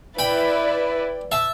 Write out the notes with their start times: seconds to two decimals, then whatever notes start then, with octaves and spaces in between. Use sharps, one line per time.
0.18 E4 B4 D5 G5 B5
1.32 E5 A5